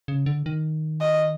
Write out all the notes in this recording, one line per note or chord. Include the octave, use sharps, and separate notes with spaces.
C#3
D3
D#3
D#5